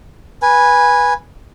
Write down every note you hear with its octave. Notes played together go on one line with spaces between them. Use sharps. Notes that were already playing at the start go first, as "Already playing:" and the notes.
B4 G#5